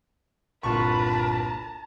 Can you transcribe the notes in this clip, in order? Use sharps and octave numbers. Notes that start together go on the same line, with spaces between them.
G1 C2 A#2 F4 B4 A5 A#5 C#6